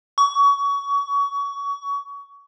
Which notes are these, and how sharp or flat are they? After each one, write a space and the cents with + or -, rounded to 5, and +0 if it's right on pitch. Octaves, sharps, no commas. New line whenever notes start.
C#6 +25